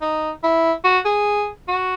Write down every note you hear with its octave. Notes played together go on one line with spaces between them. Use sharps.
D#4
E4
F#4
G#4
F#4